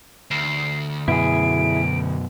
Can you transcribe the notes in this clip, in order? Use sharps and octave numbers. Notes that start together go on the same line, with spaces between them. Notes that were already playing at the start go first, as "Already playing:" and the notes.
D2 C7
F#2 B2 E4 G#4 D7